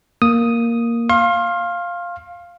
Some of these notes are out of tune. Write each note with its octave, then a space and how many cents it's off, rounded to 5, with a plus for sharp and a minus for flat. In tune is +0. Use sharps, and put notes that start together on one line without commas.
A#3 +0 D#6 +0
F5 +0 C6 +35